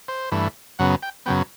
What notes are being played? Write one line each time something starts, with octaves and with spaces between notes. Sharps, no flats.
C5
G2 E3 A3
F#2 C#3 F#3 B3 F#5
G5
F#2 C#3 F#3 B3 G5